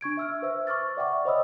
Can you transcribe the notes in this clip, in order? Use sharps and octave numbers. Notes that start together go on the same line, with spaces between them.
D4 C#6 G#6 D7
E5 E6 F6
B4 C5 E5 E6
C#6 D6 F6 A6
D5 E5 F#5 G5 C#6 D6
C5 C#5 D#5 B5 D#6 E6